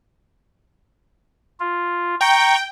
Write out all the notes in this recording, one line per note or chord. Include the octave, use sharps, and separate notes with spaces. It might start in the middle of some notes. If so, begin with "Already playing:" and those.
F4
G5 A#5 C#6